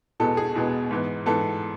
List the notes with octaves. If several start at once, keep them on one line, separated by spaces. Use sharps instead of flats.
E2 B2 G#3 B3 A4
G#4
E2 B2 G#3 B3
G#2 E3 B3
G#2 E3 B3 A4